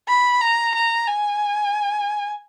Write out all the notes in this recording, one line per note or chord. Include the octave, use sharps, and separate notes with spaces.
B5
A#5
A#5
G#5